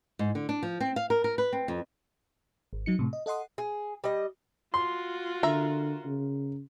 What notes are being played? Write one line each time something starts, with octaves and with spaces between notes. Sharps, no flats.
G#2
D3
D4
F3
C4
F5
A#4
A#4
B4
C4
F2
G#1
F#3 D#4 C#7
A2 C3
D#5
A4 D#5 F#5 C6 D#6
G#4
G3 D#5
F4 F#4 C6
D3 A#4 E5 A#5
C#3